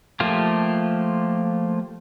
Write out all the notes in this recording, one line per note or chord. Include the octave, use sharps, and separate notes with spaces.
F3 A3 A#3 F4 G4